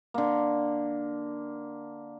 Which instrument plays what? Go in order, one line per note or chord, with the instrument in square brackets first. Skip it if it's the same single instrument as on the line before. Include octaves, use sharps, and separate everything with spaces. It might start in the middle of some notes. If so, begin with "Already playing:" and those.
[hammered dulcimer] D3 A#3